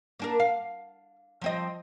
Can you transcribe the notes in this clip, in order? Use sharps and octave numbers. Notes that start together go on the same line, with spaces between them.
A#3 D4 A#4
F5
F3 C4 D#5